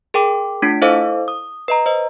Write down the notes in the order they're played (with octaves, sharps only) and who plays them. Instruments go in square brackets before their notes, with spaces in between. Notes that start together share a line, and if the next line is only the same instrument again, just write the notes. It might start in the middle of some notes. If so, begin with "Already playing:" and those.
[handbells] G#4 A#4 G5 D6
A3 D4 F4 B6 D7
E4 A4 C5 D#5 F5 D6
D#6
B4 D#5 A#5
C5 D#5